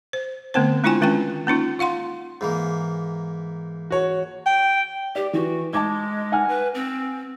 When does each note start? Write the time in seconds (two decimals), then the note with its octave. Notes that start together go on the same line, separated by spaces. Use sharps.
0.13 C5
0.54 D3 A3 B3 C4 C5
0.84 G#3 D4 E4 F4 G5 G#5
1.01 D#3 G#3 C#4 F4 G5
1.47 A#3 C#4 D#4 F4
1.79 F4 F5 F#5 C6
2.41 G#2 E3 A#3
3.91 F#4 C#5
4.46 G5
5.15 G4 D5
5.33 E3 F#4
5.73 G#3 A5 D6 G#6
6.32 F#5 G#5 F6
6.49 B4
6.74 C4